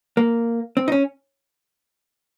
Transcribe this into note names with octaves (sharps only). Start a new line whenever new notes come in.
A#3
C4
D#4
C#4